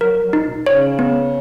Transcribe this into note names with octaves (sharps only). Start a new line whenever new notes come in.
F#3 A#4
F#3
D#4
B2
C#3 C#5
B3